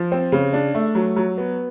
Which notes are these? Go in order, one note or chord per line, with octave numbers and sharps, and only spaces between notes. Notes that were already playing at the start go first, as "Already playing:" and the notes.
Already playing: F3
C4
C#3
D4
A3
F#3
F#3
B3